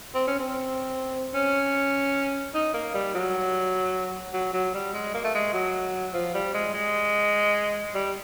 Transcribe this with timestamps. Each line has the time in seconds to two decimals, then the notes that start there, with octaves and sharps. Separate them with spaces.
0.14 C4
0.27 C#4
0.39 C4
1.34 C#4
2.54 D#4
2.74 A#3
2.94 G3
3.14 F#3
4.33 F#3
4.53 F#3
4.74 G3
4.93 G#3
5.14 A#3
5.24 A3
5.34 G#3
5.53 F#3
6.13 F3
6.34 G3
6.53 G#3
6.74 G#3
7.94 G3